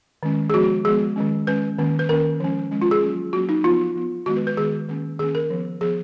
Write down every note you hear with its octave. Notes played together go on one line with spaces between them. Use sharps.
D#3 G#3 C#4
G#4
F3 G#3 B3 F#4
F#4
F3 G#3 B3 G#4
D#3 G#3 C#4
D#3 G#3 C#4 B4
D#3 A#3 C#4
B4
D#3 A#3 C#4 A#4
F3 G#3 C#4
F3 G#3 C#4
F4
G#4
F#3 A#3 C#4
F#3 A#3 C#4 F#4
D#4
F3 B3 F4
F3 B3
D#3 G#3 B3 F#4
B4
B4
D#3 G#3 B3 G#4
D#3 A#3 C#4
D#3 A#3 C#4 G#4
A#4
F3 B3
F3 B3 G#4